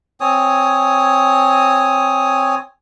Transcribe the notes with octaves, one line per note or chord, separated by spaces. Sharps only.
C4 C#5 G#5 D#6